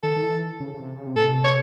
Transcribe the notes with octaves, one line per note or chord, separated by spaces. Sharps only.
D#3 A4
D#3
E3
C#3
C#3
C3
C#3
C3
A2 A4
C3
C#5